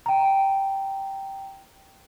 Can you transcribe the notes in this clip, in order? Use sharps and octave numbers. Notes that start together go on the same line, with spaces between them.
G5 A#5